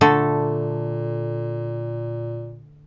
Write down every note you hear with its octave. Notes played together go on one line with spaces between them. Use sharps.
A#2 D3 A3 A4